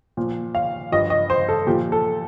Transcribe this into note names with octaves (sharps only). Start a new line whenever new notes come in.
A#2 F3
F5
G2 F3 D#5
D#5
C5
A4
A#2 F3 G4
A4